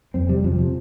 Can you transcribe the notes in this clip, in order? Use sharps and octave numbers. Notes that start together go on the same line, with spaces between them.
F2 C4
C3 G3
F2 F3
C3